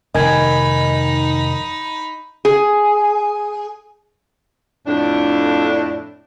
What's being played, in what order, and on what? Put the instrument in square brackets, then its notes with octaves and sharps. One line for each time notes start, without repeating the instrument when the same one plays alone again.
[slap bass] F1 [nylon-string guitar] D#3 [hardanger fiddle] D#4 B5 [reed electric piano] D#5 G#5 G#6
[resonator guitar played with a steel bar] G#4
[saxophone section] F2 A2 D4